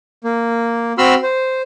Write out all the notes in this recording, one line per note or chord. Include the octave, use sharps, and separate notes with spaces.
A#3
C4 F#4 B5 C6 E6 F6
C5